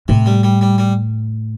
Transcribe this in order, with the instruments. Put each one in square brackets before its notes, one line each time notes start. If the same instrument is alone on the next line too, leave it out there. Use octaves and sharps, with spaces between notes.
[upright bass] A2 [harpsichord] C3
[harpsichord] G3
G3
G3
G3